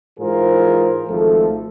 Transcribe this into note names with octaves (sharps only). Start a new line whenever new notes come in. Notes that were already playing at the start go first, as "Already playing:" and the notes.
G#2 E3 F4 G#4 A#4 C5
G#1 F3 A3 A4